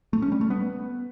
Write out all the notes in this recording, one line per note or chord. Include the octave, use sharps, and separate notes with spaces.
A3
C#4
G3
A3
B3